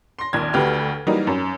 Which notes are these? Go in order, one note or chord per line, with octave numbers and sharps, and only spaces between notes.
C6 A#6
A#1 D#2 G#6
D2 F#4 G4 B4 F6
E3 F#3 G3 A#3 D#4
F#2